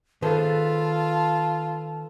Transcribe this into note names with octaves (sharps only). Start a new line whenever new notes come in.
D#3 F4 G#4 A4 B4 C5 A5